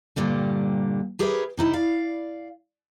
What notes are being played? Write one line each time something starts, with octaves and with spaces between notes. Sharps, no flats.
G2 A#2 D3 G3
G4 G#4 A#4 B4 C#5 E5
C3 D#4 E4
D5 F5